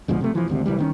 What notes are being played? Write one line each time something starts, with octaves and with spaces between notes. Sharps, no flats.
D2 G#2 B2 F3
C3 A3
E3 F3
G#1 D2 C3
C2 E3 G3
D#3 B3 C#4